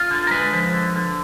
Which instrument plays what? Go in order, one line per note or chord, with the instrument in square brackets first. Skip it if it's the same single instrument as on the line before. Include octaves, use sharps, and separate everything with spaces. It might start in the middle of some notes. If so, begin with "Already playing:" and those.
Already playing: [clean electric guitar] F4
D3
A#4
G#3 B4
F3
D3
D3